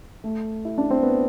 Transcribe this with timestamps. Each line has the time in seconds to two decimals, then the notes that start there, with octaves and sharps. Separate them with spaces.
0.24 A3
0.65 E4
0.78 D4
0.91 C4
1.03 B3